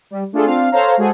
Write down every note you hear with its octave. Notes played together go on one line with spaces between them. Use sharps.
G3
A3 D4 F4 G#4 A4
C4 D4 F4 F5
A4 C5 C#5 F5 A#5
G#3 F#4 G#4 A4 C5